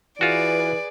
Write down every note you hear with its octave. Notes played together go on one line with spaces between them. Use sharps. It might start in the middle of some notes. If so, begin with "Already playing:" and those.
E3 F4 F#4 G#4 B4 D5